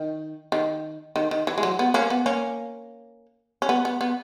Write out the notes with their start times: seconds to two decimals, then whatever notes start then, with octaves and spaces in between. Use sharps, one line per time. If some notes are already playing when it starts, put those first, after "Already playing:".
Already playing: D#3
0.52 D#3
1.16 D#3
1.31 D#3
1.47 E3
1.58 G#3
1.63 F#3
1.79 B3
1.94 A#3 C#4
2.10 B3
2.26 A#3 C#4
3.62 C#4
3.69 B3
3.85 B3
4.01 B3